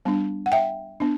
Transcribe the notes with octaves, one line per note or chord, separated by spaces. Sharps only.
G3 B3 D4
F#5
E5 G5
B3 D4